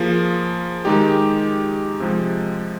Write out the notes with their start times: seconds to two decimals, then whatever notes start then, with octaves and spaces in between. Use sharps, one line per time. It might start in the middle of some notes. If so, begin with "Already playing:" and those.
Already playing: F3 A#3 F4 G#4
0.85 D#3 G#3 D#4 G4
2.00 C3 F3 G#3